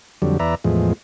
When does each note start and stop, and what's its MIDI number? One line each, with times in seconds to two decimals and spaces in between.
0.22 0.38 41
0.22 0.38 50
0.22 0.38 54
0.22 0.38 55
0.40 0.55 40
0.40 0.55 71
0.40 0.55 74
0.40 0.55 76
0.40 0.55 82
0.64 0.93 40
0.64 0.93 45
0.64 0.93 53
0.64 0.93 56